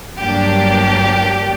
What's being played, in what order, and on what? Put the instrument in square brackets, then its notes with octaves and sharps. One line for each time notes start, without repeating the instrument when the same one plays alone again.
[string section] G1 G2 F#3 A#3 D4 G4